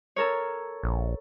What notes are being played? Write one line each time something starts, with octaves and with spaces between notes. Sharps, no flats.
A4 A#4 C#5
A#1